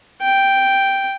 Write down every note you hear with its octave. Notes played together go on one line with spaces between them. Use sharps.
G5